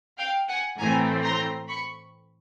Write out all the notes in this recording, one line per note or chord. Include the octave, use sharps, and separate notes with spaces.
F5 G5
F#5 G#5
A2 E3 A3 C4 G#5 A#5
A#5 C6
B5 C#6